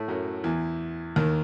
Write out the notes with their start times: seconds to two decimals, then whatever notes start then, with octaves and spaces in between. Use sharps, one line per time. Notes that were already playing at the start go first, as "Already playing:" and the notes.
Already playing: A2 A3
0.08 F#2 F#3
0.44 E2 E3
1.16 D#2 D#3